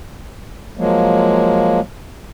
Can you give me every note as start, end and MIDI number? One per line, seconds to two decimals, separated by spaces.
0.77 1.80 53
0.77 1.80 54
0.77 1.80 56
0.77 1.80 58